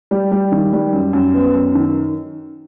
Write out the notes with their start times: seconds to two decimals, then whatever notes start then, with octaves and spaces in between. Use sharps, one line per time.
0.11 G3
0.32 G3
0.52 D#3
0.73 G3
0.93 F#2
1.13 F#2
1.34 B3
1.54 F#2
1.75 D#3